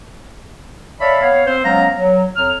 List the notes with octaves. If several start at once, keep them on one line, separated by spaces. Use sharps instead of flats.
C#5 D5 E5 F5 A5 B5
B3 C#5 F5
C4 C5
F#3 G#3 B3 C#4 F5 A#5
F#3
F2 F#3 F6